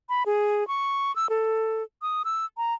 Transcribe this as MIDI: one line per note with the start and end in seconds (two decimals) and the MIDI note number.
0.09 0.23 83
0.26 0.67 68
0.68 1.14 85
1.16 1.29 88
1.29 1.83 69
2.02 2.23 87
2.25 2.45 88
2.57 2.74 82